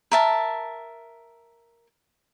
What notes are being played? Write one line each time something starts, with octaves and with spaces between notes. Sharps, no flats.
A#4 E5 A5